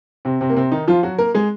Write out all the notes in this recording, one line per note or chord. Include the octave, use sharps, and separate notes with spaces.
C3 C4
C3 C4
A#3
C3 C4
D#3 D#4
F3 F4
F#3 F#4
A#3 A#4
G#3 G#4